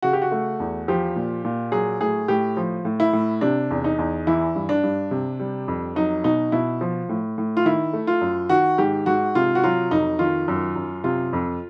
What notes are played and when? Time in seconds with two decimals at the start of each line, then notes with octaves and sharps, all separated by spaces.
0.02 C#3 F#4
0.13 G4
0.22 F#4
0.32 A3
0.60 E2
0.88 F3 G4
1.16 A#2
1.45 A#2
1.72 F#3 G#4
2.01 A2 G#4
2.28 A2 G4
2.57 F3
2.85 A2
3.00 E4
3.13 A2
3.41 C3 D4
3.71 E2
3.84 D#4
3.99 E2
4.27 E3 E4
4.55 G2
4.69 D4
4.83 G2
5.11 C3
5.39 G3
5.68 F2
5.95 F#3 D#4
6.24 B2 D#4
6.52 B2 E4
6.81 F3
7.09 A2
7.38 A2
7.57 F4
7.65 D#3 E4
7.93 A3
8.07 F4
8.21 F#2
8.49 D#3 F#4
8.78 G#2 G4
9.06 G#2 F#4
9.35 C3 F4
9.55 F#4
9.64 F#3 F4
9.91 F2 D#4
10.19 D#3 F4
10.48 F#2
10.76 F#2
11.04 C3 F4
11.33 F2